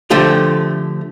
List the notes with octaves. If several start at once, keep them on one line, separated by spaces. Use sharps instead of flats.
D3 F3 A3 G4